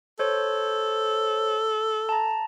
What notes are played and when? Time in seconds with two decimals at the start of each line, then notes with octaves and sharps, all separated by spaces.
0.19 A4 C5 C#5
2.09 A5 A#5